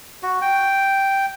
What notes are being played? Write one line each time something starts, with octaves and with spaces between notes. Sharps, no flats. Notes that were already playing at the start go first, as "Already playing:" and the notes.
F#4
G5